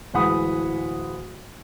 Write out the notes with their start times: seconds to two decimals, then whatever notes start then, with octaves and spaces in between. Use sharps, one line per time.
0.14 D1 E3 G#3 F#5 B5 D#6